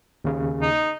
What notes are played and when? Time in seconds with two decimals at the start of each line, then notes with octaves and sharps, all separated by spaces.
0.24 D#2 C#3
0.62 D#4